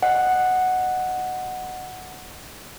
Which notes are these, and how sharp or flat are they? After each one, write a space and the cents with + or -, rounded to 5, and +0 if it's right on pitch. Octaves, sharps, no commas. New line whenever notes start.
D#5 -25 F#5 +0